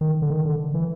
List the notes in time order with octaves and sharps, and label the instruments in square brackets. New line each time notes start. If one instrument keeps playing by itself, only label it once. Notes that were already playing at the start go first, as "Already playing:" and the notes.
[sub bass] D#3
D3
D#3
D3
E3